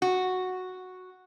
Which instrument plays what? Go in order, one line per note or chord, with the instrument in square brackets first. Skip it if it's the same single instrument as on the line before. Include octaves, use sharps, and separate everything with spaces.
[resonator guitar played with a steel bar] F#4